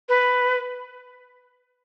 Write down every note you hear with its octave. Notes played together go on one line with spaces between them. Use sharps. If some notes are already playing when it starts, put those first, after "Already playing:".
B4